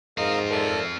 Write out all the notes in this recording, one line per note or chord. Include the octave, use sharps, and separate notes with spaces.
G#2 C4 F4 A#4 D#5 F5
A4 A#4 D5 E5